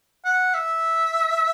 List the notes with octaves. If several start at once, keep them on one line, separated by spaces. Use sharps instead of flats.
F#5
E5